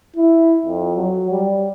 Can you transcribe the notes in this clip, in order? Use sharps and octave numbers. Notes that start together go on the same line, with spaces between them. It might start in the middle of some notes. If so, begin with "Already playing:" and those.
E4
F2
F#3
G3